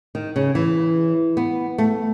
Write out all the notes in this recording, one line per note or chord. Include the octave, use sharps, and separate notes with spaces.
D#3
C#3
E3
B3
A3